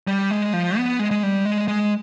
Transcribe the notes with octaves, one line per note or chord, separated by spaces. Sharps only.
G3
G#3
F3
B3
G#3
G#3
G3
G#3
G#3